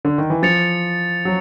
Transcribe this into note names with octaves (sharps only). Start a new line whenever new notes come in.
D3
D#3
E3
F3 A6 C#7 F7
F#3